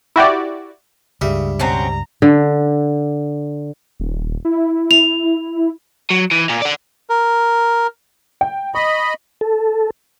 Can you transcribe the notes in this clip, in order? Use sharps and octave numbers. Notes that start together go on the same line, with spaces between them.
E4 F#4 G4 D5
C#2 G2 C#3 G3 E5
B2 C4 C#4 A#5
D3
D#1
E4
F7
F#3
E3
A#2
D5 F#5
A#4
G5
D#5 B5 C#6
A4